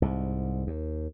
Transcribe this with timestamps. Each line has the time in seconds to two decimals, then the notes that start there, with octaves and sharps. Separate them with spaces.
0.02 C2 G#2
0.67 D#2